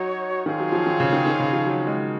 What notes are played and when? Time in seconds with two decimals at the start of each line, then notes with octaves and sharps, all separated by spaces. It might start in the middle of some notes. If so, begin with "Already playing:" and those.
Already playing: F#3 D#4 F#4 C#5
0.46 D#3 C4 F4 G#4 C#5 F5
0.60 F#3
0.72 F3
0.87 D#3
1.00 C#3
1.13 D#3
1.26 D#3
1.40 C#3
1.53 F3
1.66 F#3
1.87 G#3